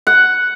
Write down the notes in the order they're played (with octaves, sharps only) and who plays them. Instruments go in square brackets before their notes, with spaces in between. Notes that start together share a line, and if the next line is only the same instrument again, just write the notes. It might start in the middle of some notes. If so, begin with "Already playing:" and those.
[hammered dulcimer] F#5